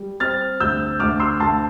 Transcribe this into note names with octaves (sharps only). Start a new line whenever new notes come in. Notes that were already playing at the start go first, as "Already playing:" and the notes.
Already playing: G3
C4 F6 A6
D2 E6 G6
D2 D6 F6
C6 E6
D2 A5 C6